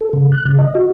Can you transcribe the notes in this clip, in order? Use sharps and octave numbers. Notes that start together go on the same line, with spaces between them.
A4
C#3
F#6
C#3
D#5
F#4